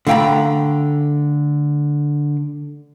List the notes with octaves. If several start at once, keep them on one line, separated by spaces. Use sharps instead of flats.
D3 A3 F5 G5 A#5 B5